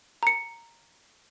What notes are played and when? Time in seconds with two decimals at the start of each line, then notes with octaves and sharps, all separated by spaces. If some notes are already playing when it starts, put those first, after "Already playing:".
0.23 A#5 C#7